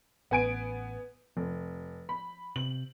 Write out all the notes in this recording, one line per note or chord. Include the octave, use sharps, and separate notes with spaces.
A1 B3 G#5 D7
F1 F3
B5
C3 F#7